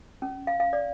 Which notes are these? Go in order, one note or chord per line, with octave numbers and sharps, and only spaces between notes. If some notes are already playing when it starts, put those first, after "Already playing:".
C#4
F5
F5
D5